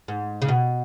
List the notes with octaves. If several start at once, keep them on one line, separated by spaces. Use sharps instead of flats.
G#2
C#3
B2